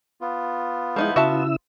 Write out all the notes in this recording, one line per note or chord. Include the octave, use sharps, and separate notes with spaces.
B3 F4
F3 G#3 D#4 E4
C#3 E4 F#4 E5 A5 E6